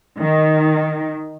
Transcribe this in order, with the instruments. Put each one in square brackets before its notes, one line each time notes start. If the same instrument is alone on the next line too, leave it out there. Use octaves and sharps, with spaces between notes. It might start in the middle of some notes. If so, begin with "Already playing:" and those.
[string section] D#3